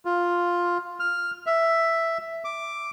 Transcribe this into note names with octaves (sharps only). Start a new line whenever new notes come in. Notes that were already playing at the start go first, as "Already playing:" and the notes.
F4
F6
E5
D6